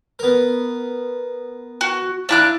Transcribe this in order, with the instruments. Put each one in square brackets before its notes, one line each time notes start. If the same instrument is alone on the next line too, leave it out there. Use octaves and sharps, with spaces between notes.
[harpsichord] B3 A#4
[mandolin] F#4
[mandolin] D4 E4 F#6 [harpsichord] F4 A#5